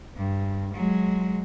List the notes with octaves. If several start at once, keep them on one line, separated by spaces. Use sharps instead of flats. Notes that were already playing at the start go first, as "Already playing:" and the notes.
G2
F#3 G#3